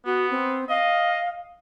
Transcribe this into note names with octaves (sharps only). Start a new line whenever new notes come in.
B3 F#4
C4
D#5 F5